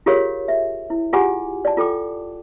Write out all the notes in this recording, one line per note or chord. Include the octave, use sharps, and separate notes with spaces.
F4 G4 G#4 A#4 C#5 F5
E5
E4
F4 G4 G#4 F#5 G#5 D6
D5 A5
F4 A4 G5 D6